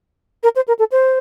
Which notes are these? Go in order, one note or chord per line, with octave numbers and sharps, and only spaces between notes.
A#4
C5
A#4
A4
C5